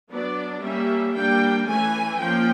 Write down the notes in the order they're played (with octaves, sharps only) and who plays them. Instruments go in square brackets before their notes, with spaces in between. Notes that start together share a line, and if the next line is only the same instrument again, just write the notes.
[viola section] F#3 B3 D4 D5
G3 A#3 C#4 E5
G3 A#3 D4 G5
E3 A3 C#4 G#5
F3 A#3 C#4 G5